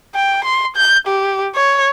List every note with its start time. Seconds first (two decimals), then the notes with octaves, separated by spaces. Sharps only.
0.15 G5
0.45 C6
0.76 G6
1.07 G4
1.55 C#5